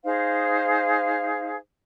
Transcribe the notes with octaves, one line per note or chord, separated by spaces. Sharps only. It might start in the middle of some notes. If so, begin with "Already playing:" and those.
D#4 G#4 C5 F5